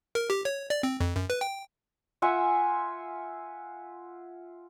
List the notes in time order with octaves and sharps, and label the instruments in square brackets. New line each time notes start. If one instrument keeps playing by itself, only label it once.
[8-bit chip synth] A#4
G4
C#5
D5
C4
F2
F#2
B4
G5
[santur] F4 E5 F#5 G#5